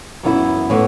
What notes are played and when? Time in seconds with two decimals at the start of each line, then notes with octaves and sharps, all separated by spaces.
0.23 F#2 E3 B3 E4
0.70 A2 E3 B3